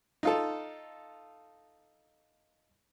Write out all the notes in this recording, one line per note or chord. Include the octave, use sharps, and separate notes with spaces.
D#4 F4 A4